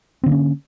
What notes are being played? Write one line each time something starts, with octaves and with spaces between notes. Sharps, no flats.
D3 A#3 C4 C#4